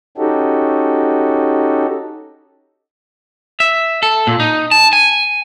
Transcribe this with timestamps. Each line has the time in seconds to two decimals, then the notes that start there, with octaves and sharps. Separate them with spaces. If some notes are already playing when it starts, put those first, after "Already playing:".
0.17 C#4 D#4 F#4 G4 A4
3.60 E5
4.03 A4
4.27 A#2
4.40 D#4
4.71 A5
4.93 G#5